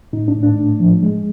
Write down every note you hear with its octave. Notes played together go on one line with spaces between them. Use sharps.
A2 D#4
D4
A2
D4
A3
F3
G#3